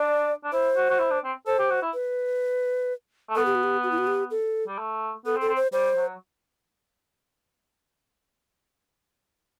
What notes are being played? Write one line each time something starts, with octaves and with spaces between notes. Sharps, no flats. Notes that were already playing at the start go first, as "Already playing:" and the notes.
Already playing: D4 D5
D4
E4 C5
F#4
F#4
E4
D4
C4
A4 C5
G4
F#4
E4
B4
A3
B3 A4
G4
F#4
G4
F#4
E4
F#4
G4
A4
G3
A3
B3 A4
C4
A4
C4
C5
G3 C5
F#3